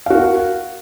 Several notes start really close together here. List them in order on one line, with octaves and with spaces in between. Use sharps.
F5 F#4 A#4 F#5